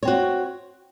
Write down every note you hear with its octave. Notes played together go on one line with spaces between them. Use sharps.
C4 F#4 C#5